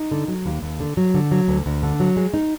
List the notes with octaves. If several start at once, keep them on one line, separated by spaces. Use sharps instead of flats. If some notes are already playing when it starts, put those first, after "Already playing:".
Already playing: D#4
D3
F#3
D#2
D#2
D3
F#3
D3
F#3
D2
D2
D3
F#3
G#3
D#4